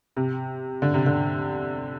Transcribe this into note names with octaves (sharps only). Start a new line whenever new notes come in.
C3
D3
C3
D3